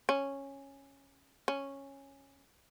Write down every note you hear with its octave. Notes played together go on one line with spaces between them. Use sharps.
C#4
C#4